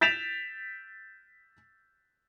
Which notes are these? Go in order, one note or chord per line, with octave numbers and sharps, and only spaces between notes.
G6 A6 B6 D7 E7 F7